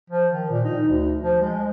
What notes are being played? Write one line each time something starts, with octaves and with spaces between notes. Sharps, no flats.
F3
D#3
A#2
D#4
D2
F3
G#3